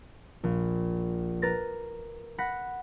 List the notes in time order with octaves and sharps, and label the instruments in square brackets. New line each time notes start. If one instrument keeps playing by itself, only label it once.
[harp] A#1
A#4 B4 A6 A#6
F#5 B5 F#6 A#6 B6